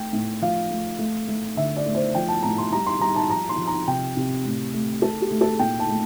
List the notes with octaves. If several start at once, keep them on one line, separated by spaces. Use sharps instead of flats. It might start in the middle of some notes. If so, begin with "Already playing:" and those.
Already playing: A3 G5
A2
F3 F5
A3
A3
A3
D3 E5
D5
A3
C5
F3 G5
A5
A2 A#5
C6
G3 A#5
C6
G3 A#5
A5
F3 A#5
C6
F3
A#5
C3 G5
C3
A2
A3
A3 A4
G4
A3
A4
A#2 G5
A5
A3